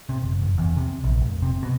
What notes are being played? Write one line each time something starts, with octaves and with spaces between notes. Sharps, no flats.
C3
F#1
F1
E2
C3
A#1
F1
C3
B2